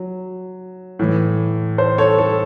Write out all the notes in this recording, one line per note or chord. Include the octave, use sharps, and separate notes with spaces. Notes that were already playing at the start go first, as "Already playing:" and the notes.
Already playing: F#3
A2 E3
C5
A4 C#5
A4